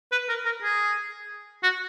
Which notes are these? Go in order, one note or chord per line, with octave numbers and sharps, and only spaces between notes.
B4
A#4
A#4
G#4
F#4